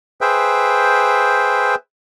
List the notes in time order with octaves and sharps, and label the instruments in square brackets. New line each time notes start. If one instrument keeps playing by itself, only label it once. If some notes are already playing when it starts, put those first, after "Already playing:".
[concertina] G#4 B4 C5 E5 G5